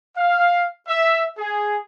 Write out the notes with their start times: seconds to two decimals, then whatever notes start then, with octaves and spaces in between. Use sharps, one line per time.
0.17 F5
0.88 E5
1.38 G#4